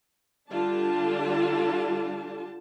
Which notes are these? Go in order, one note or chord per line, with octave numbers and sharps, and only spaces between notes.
D3 G3 D4 F4 A5